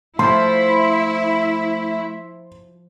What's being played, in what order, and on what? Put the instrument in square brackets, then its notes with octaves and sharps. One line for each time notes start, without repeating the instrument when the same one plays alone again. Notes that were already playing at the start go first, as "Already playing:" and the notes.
[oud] F3 [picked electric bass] A3 [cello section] E4 [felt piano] C6